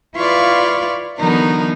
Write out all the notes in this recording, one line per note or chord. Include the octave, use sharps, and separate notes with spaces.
E4 F4 B4 D5 F5 C#6
D3 E3 F#3 B3 D#4 A#4